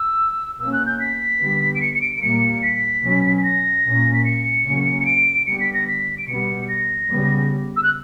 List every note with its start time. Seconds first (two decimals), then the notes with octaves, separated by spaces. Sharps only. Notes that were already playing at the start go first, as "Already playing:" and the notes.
Already playing: E6
0.59 B2 A#3 C#4 E6
0.73 F#6
0.86 G6
1.00 B6
1.41 D3 G3 B3
1.75 D7
1.81 C#7
1.95 C#7
2.01 D7
2.15 D7
2.22 A#2 G3 A#3 C#7
2.63 B6
3.03 B2 F#3 C#4
3.37 B6
3.43 A#6
3.84 A#2 A#3 C#4
4.14 B6
4.25 C#7
4.66 C#3 F#3 A#3 C#4
5.00 C#7
5.06 D7
5.46 D3 G3 B3 C#7
5.60 B6
5.74 A#6
5.87 B6
6.18 D7
6.27 B2 G3 B3 C#7
6.68 A#6
7.09 C#3 G3 B3
7.76 E6
7.83 F#6